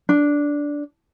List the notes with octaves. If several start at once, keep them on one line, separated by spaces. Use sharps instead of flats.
D4